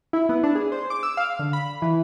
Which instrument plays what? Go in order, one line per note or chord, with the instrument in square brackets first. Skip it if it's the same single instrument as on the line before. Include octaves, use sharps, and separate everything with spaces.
[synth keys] E4
B3
D4
G#4
C5
D6
E6
F5
D3
B5
E3